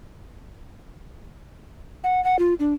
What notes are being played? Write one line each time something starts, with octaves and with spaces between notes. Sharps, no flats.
F#5
F#5
F4
D4